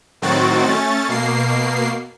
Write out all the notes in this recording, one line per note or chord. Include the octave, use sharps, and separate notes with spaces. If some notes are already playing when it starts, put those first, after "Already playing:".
A2 D#3 F#3 C4 F#4 A6
A3 C#4 A6
B2 A#3 C7